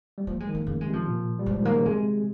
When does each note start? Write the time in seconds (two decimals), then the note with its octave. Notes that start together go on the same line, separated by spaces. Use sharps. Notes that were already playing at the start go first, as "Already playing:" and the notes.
0.18 G3
0.27 F3 A#3
0.40 G#3
0.47 D#3
0.55 A#3
0.67 C#3 A#3
0.81 G#3
0.86 C3
0.93 F3
1.07 A#2
1.39 G3
1.46 F3 G#3
1.62 D#3 A#3
1.73 C#3
1.85 C3 G#3